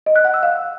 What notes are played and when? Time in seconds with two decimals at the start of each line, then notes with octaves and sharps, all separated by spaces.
0.06 D#5
0.16 F#6
0.25 F#5
0.34 E6
0.43 F5